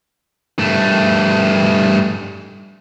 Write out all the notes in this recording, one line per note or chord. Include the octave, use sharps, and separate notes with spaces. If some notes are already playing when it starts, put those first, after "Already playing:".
G2 A3